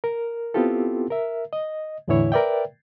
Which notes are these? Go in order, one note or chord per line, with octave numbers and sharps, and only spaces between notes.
A#4
B3 C4 E4 F4 G4 A4
A#4 E5
D#5
E2 A2 D3 E3 E4 C#5
A#4 B4 D5 E5 G5